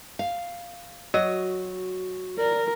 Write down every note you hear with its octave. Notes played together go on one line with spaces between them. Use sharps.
F5
F#3 F#4 D#5
A#4 D5